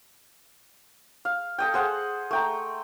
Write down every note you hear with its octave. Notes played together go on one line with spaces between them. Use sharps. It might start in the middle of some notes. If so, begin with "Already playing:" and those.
F5
A4 D#5 G5
G#4 C5 F#5
A3 G5 A#5